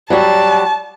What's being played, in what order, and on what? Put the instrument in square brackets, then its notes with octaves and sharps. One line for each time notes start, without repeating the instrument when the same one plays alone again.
[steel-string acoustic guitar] F#3 G3 F#4 [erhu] A5